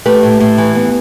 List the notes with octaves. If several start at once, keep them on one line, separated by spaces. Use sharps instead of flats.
A3 G4 B4
A2
A2
E3
B3